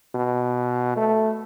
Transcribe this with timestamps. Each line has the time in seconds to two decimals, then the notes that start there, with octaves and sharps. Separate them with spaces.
0.15 B2
0.96 A3